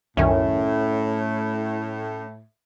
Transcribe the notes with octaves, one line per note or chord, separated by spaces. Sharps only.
C2 F#2 A2 D#3 C#4 E5